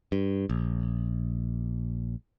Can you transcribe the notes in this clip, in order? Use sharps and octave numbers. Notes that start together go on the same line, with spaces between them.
G2
A#1